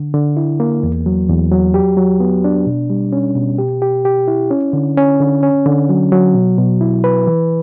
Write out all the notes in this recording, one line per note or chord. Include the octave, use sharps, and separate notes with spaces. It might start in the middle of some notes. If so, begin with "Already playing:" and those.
Already playing: D3
D3
E4
A#3
E2
F#3
E2
F#3
G4
F#3
B3
D4
B2
G3
C#4
B2
G4
G4
G4
E4
C#4
D3
C#4
D3
C#4
D3
F#3
F#3
B2
B2
E4
B4
E3